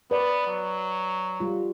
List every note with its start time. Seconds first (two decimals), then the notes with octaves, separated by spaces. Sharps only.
0.11 B3 B4 D5
0.47 F#3
1.40 G3 F4